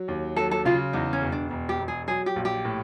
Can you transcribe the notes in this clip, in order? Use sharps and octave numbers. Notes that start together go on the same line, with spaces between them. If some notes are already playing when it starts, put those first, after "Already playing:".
Already playing: F#3
D#2
F#3 A4
A4
C#3 F4
E2 D#4
C#4
E1
D4
E1
G4
E1
G#4
F#3 G#4
G4
A#1
G4
A2